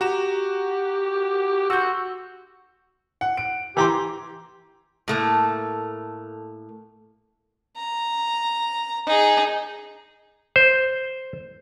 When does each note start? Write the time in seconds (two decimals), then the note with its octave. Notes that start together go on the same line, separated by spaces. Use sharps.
0.01 F#4 G4 A#5 E7
1.70 F#4 E6 G6
3.21 F#5
3.37 D7
3.77 E3 G4 A#5 C6
5.08 A2 A3 A#3
7.77 A#5
9.06 D#4 G#4
10.56 C5